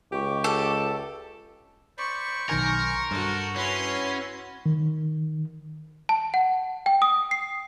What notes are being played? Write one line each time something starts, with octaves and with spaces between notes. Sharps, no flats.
C#2 G4 C#6 D6
A4
C5 D5 B5 C#6
B1 D#3 A#4 C5 G#5
G2 F#4 A4
C#4 E4 F#4 B4 C6
D#3
A5
F#5
G5
D#6
C7